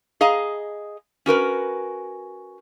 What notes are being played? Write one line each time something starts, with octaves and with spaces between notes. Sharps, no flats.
G#4 D#5 F5 A#5
C#4 F#4 A#4 B4